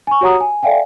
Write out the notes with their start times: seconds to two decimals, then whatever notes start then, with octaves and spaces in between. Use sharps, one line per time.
0.07 G#5 C#6
0.21 F#4 G4 C#5 F#5 A#5 D#6
0.40 G#5
0.63 A4 D5 E5 F5 G5 G#5